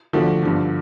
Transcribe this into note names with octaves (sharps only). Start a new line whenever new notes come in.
D3 F3 A3 D4 F#4
G2 D3 F3